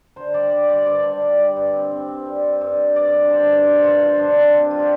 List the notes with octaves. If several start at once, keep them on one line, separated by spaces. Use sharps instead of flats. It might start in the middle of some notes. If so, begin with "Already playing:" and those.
D3 C5
G3 D5
G3
G3 D5
G2 D5
D3
G3
G3
G2
C4
C4
C4
G3
C4
G2
G3
G2 D5
G2
D3 C5
G2
G2 C5
G2 F4
F3 F4
G2 D4
C4 D4
C4
G3 F4
G4